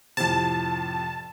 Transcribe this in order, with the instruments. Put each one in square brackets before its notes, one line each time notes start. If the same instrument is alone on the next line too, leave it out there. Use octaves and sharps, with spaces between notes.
[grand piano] F2 A2 C3 [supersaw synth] A5